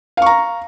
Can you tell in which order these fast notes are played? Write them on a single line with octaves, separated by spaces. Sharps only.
F5 C#6 A#5